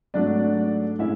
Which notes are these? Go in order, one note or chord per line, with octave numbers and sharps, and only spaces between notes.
G#2 F#3 A3 D4 D5
A2 G#3 C#4 E4 E5